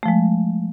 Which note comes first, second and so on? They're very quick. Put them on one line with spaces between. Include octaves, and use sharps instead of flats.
A3 F3 G#3